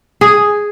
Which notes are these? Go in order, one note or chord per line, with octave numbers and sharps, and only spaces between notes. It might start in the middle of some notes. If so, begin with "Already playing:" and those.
G#4